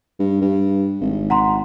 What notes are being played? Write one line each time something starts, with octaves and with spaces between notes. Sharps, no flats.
G2
G2
G#1
F#5 A#5 C6